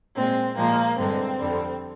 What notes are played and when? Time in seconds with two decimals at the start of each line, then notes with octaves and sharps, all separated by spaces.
0.16 A#2 G#3 C4
0.57 A#2 F3 G#3 A#3
0.98 G2 D3 G#3 C4
1.39 F2 D3 G3